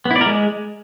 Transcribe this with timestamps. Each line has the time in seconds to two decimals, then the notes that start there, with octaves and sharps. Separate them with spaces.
0.05 B3
0.11 E4
0.16 D5
0.21 A#4
0.26 G#3